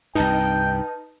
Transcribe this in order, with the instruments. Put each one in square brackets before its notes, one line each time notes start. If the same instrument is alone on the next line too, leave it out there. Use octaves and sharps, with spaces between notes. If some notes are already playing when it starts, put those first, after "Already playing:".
[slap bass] C2 G2 [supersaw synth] D#4 [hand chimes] B4 A5 G6 [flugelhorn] G5